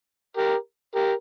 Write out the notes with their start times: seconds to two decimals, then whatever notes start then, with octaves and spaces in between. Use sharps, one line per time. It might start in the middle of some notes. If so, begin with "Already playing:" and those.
0.37 G4 A#4
0.95 G4 A#4